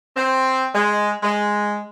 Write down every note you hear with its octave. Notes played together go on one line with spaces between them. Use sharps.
C4
G#3
G#3